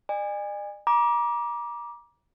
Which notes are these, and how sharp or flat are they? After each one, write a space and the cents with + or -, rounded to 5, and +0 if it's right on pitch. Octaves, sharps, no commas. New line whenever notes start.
D5 +45 G#5 -30
A#5 +35 D6 +0